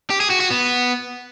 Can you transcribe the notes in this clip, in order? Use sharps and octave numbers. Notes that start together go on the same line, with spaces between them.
G4
G#4
F#4
F#4
B3